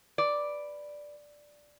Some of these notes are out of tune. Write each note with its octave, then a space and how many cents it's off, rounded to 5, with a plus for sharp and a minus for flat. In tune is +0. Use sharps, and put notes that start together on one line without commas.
B4 +0 D5 +0